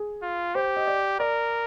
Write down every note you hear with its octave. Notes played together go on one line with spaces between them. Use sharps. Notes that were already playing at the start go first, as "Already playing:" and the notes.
Already playing: G#4
F4
G4 C5
D#5
D5
A#4 D5